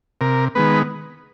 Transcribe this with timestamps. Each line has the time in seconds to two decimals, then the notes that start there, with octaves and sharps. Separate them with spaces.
0.21 C3 A#4
0.55 D#3 G#3 B3 B4